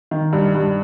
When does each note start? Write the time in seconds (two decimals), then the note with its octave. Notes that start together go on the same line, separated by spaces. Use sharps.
0.11 D#3
0.33 G2
0.54 G2